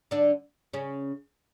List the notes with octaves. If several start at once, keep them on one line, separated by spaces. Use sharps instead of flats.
D3 D4
C#3 C#4